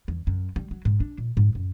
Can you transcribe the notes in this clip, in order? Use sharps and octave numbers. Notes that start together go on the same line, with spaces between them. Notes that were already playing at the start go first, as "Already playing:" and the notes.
E2
F#2
G3
F#3
G#2
D4
A#2
G#2
F#2